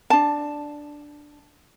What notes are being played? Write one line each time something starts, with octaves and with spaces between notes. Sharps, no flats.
D4 A5